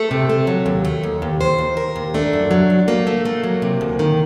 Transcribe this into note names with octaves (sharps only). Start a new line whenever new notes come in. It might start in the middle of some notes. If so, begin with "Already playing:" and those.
Already playing: A3 A4
C3
A3
F#3
D#2
A3
D#2
D#2
D#2 C5
D#2
D#2 A#4
D#2
A3 D4
F#2
F#3
F#2
A3 A#3
A3
A3
F#3
C3
D2
D#3